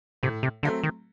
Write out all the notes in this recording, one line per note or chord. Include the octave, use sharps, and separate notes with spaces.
A2 C3
C3
D3 F#3 A3 C4
D#3